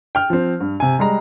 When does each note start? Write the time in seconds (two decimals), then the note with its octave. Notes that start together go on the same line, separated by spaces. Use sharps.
0.15 G5 F6
0.30 F3 C4
0.60 G2
0.80 C3 G#5
0.99 G3 G#3 A#5